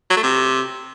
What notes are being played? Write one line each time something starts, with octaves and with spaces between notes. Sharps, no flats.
F#3
A3
C3